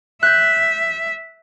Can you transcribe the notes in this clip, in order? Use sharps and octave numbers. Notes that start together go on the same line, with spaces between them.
E5 F#6 G6